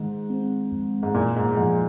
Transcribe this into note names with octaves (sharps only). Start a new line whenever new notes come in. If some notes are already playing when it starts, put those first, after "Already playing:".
Already playing: G#2 D#3 G#3
C4
F2
G#2
A#2 A#3
G#2
G#2 F3